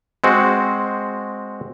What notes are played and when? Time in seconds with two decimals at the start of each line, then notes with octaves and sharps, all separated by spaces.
0.24 G#3 C4 F#4